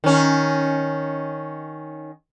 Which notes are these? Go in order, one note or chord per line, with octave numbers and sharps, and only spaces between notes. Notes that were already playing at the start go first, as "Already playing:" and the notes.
D#3 C#4